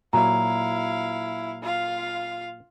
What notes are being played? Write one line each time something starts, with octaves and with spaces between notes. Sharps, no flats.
A#2 F#3 E4 F5 A#5
F4 F5